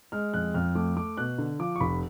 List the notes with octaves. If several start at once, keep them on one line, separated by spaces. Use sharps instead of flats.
G#3 F6
F2 F#6
F2 F6
A3 D6
A3 D6
B2 F#6
D3
F3 D6
C#6
F1 B5